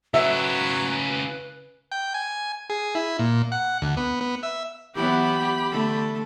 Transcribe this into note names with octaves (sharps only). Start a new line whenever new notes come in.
C#3 F#3 E4 B4 E5
G5
G#5
G#4
E4
A#2
F#5
D2
B3
B3
E5
E3 F#3 B3 G4 B5
D3 A3 A4